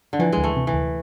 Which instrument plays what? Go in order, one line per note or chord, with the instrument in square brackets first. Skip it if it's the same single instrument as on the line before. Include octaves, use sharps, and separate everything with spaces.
[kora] D3
[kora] E3 [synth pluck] F3
[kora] G#3
[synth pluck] D2
[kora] A3
[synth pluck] C3
[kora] E3
[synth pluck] D2